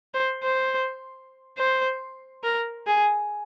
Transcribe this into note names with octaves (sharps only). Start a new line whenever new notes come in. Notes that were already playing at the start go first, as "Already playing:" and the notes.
C5
C5
C5
A#4
G#4